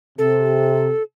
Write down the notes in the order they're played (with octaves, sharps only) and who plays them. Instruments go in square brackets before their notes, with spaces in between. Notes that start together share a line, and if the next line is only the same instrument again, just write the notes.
[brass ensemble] C3 [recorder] A4